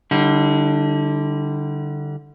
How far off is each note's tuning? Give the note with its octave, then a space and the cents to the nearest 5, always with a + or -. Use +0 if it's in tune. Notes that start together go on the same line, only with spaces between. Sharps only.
D3 +0 G3 -15 E4 -45